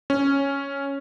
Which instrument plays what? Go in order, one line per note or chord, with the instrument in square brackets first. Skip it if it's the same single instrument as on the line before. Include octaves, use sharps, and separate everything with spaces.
[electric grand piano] C#4